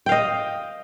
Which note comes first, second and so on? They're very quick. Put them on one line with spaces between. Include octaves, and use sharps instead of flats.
G5 F5 D#5